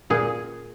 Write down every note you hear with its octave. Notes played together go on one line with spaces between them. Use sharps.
A#2 G#4